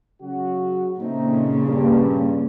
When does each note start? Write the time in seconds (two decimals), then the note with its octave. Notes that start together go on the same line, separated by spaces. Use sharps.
0.21 C#3 F#3 F#4
1.00 A#2 C#3 A3 C4 D#4
1.64 G2